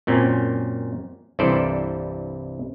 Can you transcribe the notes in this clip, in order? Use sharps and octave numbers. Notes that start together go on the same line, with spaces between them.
F#2 A#2 C4 C#4
C2 G2 E3 A4 C5 D5